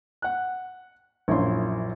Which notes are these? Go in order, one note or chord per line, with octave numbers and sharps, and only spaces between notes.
F#5 F#6
A#1 F#2 C#4 E4 F4 C6